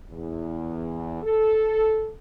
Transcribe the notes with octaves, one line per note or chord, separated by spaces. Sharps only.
E2
A4